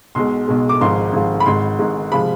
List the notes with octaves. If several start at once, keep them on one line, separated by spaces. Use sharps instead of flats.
B1 B2 G#3 C6
B1 B2 G#3
D6
G#1 G#2 F3 G#3 C6
G#1 G#2 F3 G#3
B5
G#1 G#2 G#3 C6
G#1 G#2 G#3
C3 F3 G#3 B5